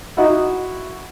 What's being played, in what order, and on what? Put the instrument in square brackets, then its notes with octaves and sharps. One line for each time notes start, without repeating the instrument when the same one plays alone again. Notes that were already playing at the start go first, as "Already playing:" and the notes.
[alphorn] D#4 [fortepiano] E4 F#4